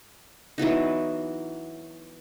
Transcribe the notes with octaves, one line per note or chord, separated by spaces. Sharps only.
E3 F#3 B3 D#4